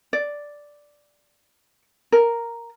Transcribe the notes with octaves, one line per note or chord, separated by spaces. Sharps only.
D5
A#4